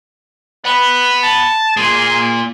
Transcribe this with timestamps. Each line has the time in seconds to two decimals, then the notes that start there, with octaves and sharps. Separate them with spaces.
0.65 B4 F#5 B5
1.23 A5
1.77 A#3 F4 G#4